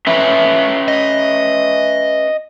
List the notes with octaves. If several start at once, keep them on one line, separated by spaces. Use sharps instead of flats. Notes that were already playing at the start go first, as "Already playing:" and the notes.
C#4 B4 E5
D#5